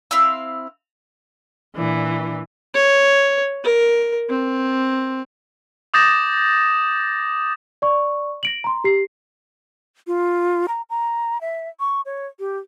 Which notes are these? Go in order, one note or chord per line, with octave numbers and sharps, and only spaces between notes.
C4 E4 F5 E6
A#2 E3 D4
C#5
A#4
C4
D6 D#6 G6 A6 A#6 E7
D5 C#6
A#6 D7 F#7
A#5 C6
G4 C7
F4
A#5
A#5
E5
C#6
C#5
G4